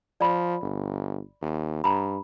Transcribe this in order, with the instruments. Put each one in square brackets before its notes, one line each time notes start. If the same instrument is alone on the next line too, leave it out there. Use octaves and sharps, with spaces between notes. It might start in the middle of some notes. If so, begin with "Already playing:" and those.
[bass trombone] F3 [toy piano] D5 B5
[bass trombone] G1
D#2
[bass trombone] G2 [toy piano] A#5 B5